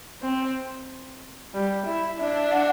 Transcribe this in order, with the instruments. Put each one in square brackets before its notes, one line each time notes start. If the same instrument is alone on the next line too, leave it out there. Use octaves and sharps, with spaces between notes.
[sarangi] C4
G3
E4
[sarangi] D4 [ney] E5
[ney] F#5